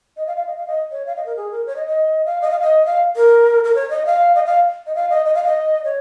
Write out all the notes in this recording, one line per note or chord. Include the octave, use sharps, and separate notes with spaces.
D#5
F5
F5
D#5
F5
D#5
C#5
F5
D#5
A#4
G#4
A#4
C#5
D#5
D#5
F5
D#5
F5
D#5
F5
A#4
A#4
C#5
D#5
F5
D#5
F5
D#5
F5
D#5
D#5
F5
D#5
C#5